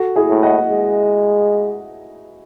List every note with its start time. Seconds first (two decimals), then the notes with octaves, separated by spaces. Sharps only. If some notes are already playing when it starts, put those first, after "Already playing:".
Already playing: F#4 A4
0.16 E4 G#4
0.29 A2
0.43 D#5 F#5
0.69 G#3